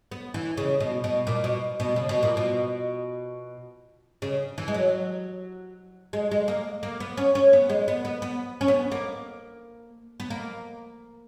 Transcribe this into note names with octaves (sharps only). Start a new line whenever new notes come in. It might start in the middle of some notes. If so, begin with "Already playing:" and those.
B3
E3
C#3
B2
B2
A#2
B2
B2
C#3
B2
A#2
B2
C#3
E3
G#3
F#3
G#3
G#3
A#3
A#3
B3
C#4
C#4
B3
G#3
B3
B3
B3
C#4
B3
A#3
B3
A#3